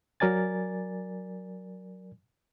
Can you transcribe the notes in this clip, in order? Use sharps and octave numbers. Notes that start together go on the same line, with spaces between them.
F#3 A#4 D5 G#5 A6